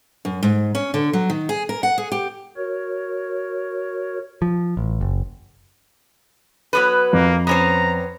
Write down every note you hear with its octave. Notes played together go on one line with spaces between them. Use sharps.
F#2
G#2
C#4
D3
F#3
D#3
G#4
A#4
F#5
G#4
G4
F#4 A#4 C#5
F3
A1
F#1
F#3 B3 B4
F2 A#3
B3 C#4 C5 A#5